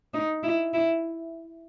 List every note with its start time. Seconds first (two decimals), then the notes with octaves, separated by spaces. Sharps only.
0.14 D#4
0.43 E4
0.73 E4